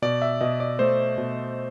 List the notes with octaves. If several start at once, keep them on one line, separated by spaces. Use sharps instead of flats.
B2 D5
E5
B2 D#5
D5
A3 C5
B2